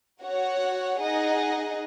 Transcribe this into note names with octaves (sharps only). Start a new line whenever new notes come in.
F#4 C#5 F#5
D#4 G#4 D#5 F#5